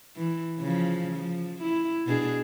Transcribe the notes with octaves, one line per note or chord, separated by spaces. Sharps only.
E3
C#3 F3
F3
E4
B2 D4 G#4